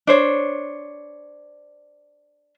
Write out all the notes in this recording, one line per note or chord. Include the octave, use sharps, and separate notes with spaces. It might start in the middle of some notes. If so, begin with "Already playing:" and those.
D4 C5 C#5